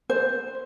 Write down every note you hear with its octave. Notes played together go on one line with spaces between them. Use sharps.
C5